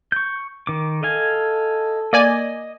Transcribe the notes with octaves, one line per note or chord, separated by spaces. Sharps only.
C#6 G6
D#3 D6
A4 D#5 F5 G#5
A#3 D5 D#5 G#5